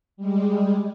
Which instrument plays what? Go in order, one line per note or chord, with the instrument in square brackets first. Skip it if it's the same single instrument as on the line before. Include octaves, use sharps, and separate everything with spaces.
[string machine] G3 G#3